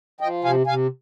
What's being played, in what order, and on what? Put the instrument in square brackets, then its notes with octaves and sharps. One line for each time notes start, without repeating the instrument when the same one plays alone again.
[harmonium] F3 D#5 G5
C3 F5 G#5
C3 F5 G#5